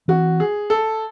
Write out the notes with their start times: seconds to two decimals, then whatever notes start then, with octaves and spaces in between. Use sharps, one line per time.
0.08 E3 C4 F#4
0.40 G#4
0.70 A4